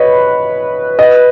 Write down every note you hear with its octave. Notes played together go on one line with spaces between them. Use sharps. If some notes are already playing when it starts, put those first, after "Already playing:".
Already playing: B4 C#5 D#5
D#5